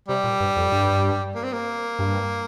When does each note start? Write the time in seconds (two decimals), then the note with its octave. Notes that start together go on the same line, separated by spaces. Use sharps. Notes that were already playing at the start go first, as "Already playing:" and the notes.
0.09 C3 G3
0.24 A#2
0.40 G2
0.57 F2
0.72 G2
1.35 A#3
1.43 C4
1.52 A#3
1.99 G2